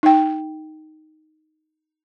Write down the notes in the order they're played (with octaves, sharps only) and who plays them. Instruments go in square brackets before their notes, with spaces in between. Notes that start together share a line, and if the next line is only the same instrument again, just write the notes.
[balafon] D#4 G5